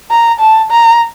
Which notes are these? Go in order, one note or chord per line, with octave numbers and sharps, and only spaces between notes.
A#5
A5
A#5